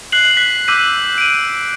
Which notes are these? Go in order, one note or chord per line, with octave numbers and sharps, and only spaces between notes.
F#6 C7 F#7
F#6 B6
D6 E6 G6 B6 D#7
D7 D#7